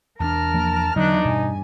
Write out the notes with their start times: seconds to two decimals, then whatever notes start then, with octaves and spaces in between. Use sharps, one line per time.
0.20 E2 C4 D4 A#4 A5 A#5 F6
0.54 F3 A#3
0.96 E2 D3 F#3 D4 D#4 F#6
1.25 G2 B2 G#5